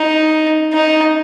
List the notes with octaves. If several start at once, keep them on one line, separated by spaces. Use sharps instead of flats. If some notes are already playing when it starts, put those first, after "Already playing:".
Already playing: D#4
D#4